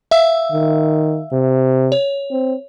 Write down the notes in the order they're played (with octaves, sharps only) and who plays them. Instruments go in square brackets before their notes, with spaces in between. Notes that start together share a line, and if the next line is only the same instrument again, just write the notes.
[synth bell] E5 F5 E6
[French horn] D#3
C3
[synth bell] C#5
[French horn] C4